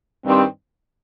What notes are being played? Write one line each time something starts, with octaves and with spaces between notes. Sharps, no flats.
G2 D#3 G3 C4